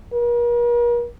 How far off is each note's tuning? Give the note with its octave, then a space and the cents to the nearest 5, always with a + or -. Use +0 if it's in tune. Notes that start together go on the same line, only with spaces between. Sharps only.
A#4 +45